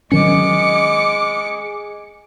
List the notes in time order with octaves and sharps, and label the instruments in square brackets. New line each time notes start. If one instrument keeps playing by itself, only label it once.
[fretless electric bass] D#3 F#3 C#4 [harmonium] G#3 [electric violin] D6 C#7